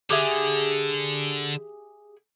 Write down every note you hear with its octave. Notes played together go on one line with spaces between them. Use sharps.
D3 G4 G#4 E5